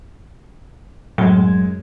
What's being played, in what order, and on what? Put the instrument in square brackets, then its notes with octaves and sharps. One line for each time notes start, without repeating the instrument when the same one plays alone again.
[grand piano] F#2 G#3 [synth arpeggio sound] A2 [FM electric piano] F#3 G#6